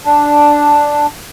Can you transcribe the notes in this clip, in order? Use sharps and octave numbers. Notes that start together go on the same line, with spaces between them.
D4